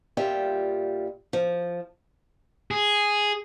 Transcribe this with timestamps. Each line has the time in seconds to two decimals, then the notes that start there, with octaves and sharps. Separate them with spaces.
0.17 A#2 G3 F4 E5 G5
1.33 F3
2.71 G#4